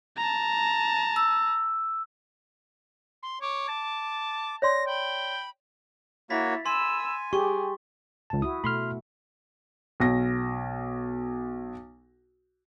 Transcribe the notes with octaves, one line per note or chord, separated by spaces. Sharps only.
A5 A#5
E6
C6
C#5 D6
A5
C#5 D5 C6 A#6
G5 B5
A#3 E4 F#4 C#5 B5 A6 B6
G#5 B5 C6 E6
G4 G#4 C#6
C#2 A5
E4 F#4 D#6
B2 A3 B5 C6 F6
B1 A#6